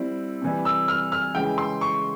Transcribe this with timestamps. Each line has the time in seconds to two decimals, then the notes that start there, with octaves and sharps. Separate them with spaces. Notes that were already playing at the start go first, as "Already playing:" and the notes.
Already playing: G3 C4 E4
0.42 C3 E3 G3
0.65 E6
0.88 F6
1.12 F6
1.35 C#3 E3 G#3 G5
1.58 C6
1.81 C#6